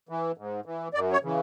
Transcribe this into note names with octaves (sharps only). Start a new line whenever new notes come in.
E3
G#2
E3
F#2 D5
C#5
C#3 E3